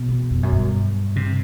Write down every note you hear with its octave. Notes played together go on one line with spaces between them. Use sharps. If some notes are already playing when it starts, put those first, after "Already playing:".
Already playing: B2
E2
F2
F#2
G2
C3